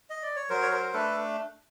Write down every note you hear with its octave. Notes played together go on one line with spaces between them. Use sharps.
D#5
D5
C#5
F#3 A#4 C5
C#5
A#4 C5
A#4
A3 D4 A4 B4